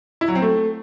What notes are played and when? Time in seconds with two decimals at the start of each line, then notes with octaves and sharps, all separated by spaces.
0.21 E4
0.28 F#3
0.35 C4
0.42 A3